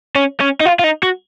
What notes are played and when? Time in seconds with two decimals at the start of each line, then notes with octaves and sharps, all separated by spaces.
0.15 C#4
0.40 C#4
0.60 D#4
0.65 F4
0.79 F4
0.84 D#4
1.03 F#4